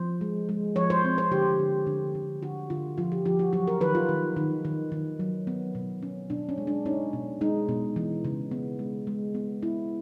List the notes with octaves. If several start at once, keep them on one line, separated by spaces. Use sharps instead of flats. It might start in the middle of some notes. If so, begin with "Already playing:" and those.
Already playing: F3 C5
G#3
G#3
F3 C#5
C5
C4
C5
D3 G4
D3
D3
D3
D3 F#4
D3 F4
F3 F4
G4
F3 G4
F#4
F#3 F#4
A#4
D#3 B4
F4
D#3
D#3
D#3
D#3
F#3
B3
B2
C#4
B2 D4
C#4
G#3
D4
C#4 D#4
B2
G#3 D#4
B2
E3
C#3
B3
G#3
G#3
B3
B3 E4